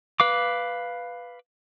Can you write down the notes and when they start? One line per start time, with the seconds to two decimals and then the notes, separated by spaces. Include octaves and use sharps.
0.20 B4 F5 D6